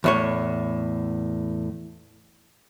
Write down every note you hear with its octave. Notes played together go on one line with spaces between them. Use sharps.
E2 A2 C#5